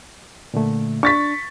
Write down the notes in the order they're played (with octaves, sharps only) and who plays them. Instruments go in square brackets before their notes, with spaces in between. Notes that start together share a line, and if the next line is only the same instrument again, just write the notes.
[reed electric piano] A#2 D3 A3
[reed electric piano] D4 [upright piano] C#6 A6 B6